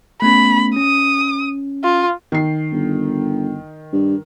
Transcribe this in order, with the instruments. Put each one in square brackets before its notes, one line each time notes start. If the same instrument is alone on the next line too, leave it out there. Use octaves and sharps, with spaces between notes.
[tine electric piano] A3 B3 C#4 [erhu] B5
[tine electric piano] C#4 [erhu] D#6
[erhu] F4
[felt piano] D#3 C7
[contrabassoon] G1
G2